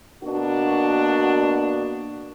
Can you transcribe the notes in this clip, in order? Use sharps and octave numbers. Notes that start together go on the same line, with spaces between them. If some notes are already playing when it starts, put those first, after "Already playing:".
B2 A#3 D4 F#4